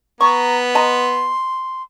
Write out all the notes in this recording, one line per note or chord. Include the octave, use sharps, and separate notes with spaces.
B3 A#5 C#6
D#5 A5 A#5 C6